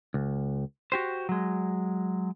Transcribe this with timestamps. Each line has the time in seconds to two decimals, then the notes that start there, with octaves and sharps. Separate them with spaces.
0.14 C#2
0.92 F#4 G4 C5
1.29 F#3 G#3